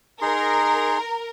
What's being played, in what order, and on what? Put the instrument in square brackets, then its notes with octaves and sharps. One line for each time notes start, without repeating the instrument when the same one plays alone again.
[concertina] D#4 G#4 C6 [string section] A#4